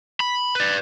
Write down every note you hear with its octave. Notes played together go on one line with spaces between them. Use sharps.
B5
B4 D5